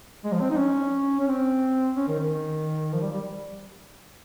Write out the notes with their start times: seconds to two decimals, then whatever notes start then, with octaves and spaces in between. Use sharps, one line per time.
0.24 G#3
0.32 F3
0.41 C4
0.50 D#4
0.58 C#4
1.20 C#4
1.28 C4
1.96 C#4
2.08 D#3
2.19 D#3
2.93 F3
3.01 G3
3.12 G3